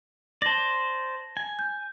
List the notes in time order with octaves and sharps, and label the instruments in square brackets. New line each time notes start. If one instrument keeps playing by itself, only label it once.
[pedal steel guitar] C5 D5 [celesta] A5 A#6
[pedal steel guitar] G#5
[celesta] G6